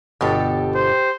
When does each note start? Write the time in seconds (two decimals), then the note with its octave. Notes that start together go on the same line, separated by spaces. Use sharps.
0.21 G1 B2 G4 A4
0.75 C5